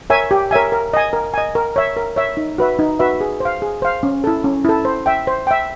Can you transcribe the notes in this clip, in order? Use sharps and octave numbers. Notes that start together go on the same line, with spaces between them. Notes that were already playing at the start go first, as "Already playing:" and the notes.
A#4 C#5 E5 G#5
G4
A#4 C#5 E5 G#5
A#4
D#5 G#5
A#4
D#5 G#5
A#4
C#5 E5
A#4
C#5 E5
D#4
F#4 B4 E5
D#4
F#4 B4 E5
G#4
C5 F5
G#4
C5 F5
C#4
E4 A4
C#4
E4 A4
C5
E5 G5
C5
E5 G5